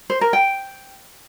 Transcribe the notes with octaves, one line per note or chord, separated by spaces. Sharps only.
C5
A#4
G5